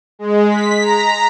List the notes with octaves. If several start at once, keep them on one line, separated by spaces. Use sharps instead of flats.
G#3
B6
A#5